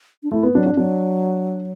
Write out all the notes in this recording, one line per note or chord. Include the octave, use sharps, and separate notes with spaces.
D4
A3 E4
B3
F#3 D4
D4
F#3 D4